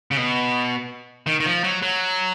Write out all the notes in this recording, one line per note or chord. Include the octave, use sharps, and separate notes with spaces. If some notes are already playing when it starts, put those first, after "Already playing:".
C#3
B2
D#3
D#3
F3
F#3
F#3